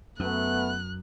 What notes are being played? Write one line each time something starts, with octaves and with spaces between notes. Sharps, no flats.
F#2 A3 B3 F#6